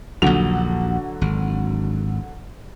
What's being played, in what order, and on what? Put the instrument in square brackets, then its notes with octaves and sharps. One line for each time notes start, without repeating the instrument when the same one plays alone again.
[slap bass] A#1 D#2 [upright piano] D3 F#3 F7
[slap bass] G#1